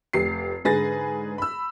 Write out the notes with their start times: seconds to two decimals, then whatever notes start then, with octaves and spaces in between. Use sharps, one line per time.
0.13 F1 G4 C7
0.65 G#2 D3 G#4 B4 A6 A#6
1.38 B5 E6